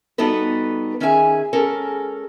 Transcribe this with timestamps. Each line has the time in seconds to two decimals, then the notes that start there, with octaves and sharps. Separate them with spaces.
0.18 G3 B3 D#4 F#4 A4 B4
1.00 D#3 C#4 G#4 E5 G5 G#5
1.53 G#3 C#4 A4 A#4